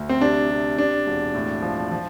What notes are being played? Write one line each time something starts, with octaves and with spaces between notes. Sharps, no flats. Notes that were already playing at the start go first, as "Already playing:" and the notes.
Already playing: D2
C4
C3 D4
C3
C3 D4
E1
A2
F3
F3